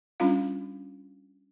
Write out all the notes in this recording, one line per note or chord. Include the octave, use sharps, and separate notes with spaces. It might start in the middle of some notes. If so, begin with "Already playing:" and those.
G3 C#4 D4 F4 F5